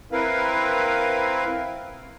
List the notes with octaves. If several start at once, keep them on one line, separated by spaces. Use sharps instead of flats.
C4 E4 A#4 B4 F5